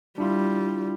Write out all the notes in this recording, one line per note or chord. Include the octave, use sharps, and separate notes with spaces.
G3 D4 E4 F4